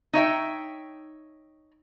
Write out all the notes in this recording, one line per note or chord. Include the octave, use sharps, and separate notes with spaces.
D#4 C#5 E5 G5